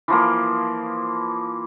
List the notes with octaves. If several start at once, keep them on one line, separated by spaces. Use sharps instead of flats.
E3 F3 A#3